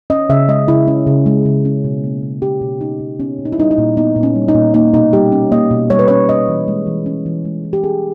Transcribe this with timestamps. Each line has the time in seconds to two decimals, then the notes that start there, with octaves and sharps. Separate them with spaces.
0.10 C#4 D#5
0.29 C#3 E5
0.48 G#3 D#5
0.68 C#3 E4
0.87 C#4
1.07 C#3
1.26 G#3
1.46 C#3
1.65 C#4
1.84 B2
2.04 A#3
2.23 B2
2.42 C#4 G4
2.61 B2
2.81 A#3 D#4
3.00 B2
3.19 B3 C#4
3.38 A#2
3.45 D#4
3.52 E4
3.58 G3 D#4
3.71 D#4
3.78 A#2
3.97 B3 D#4
4.16 A#2
4.23 C#4
4.35 G3
4.48 D#4
4.55 A#2
4.74 A#3 D#4
4.94 B2 D#4
5.13 G3 G4
5.32 C#4
5.52 A#3 D#5
5.71 B2
5.90 G3 C#5
5.99 B4
6.08 C#4 C#5
6.29 C#4 D#5
6.48 E3
6.68 G#3
6.87 E3
7.06 C#4
7.26 E3
7.45 G#3
7.64 E3
7.73 G4
7.84 C#4 G#4